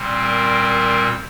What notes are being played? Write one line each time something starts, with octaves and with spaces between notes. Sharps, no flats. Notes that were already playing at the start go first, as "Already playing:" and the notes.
Already playing: A#2 G3 C4
A#4
A#4